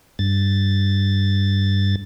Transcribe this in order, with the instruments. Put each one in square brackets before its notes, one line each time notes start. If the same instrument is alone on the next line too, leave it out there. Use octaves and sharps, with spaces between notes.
[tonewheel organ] G2 A6